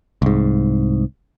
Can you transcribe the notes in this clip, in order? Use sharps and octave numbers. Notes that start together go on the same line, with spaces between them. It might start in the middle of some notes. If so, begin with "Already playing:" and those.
C2 G#2